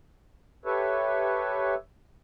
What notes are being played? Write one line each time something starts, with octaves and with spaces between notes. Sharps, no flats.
G4 A4 B4 C#5 E5